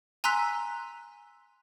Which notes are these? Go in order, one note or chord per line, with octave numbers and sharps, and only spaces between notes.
G#5 A#5 C6 E6 F#6 B6